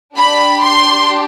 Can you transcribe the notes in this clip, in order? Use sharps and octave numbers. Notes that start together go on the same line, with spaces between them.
D4 G4 B5
C6